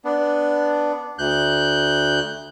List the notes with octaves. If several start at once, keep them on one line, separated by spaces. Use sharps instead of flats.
B3 D4
D2 F#6 G6